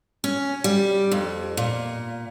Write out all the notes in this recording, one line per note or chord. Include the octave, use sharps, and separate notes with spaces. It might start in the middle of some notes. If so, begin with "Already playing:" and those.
C#4
G3
F2
A#2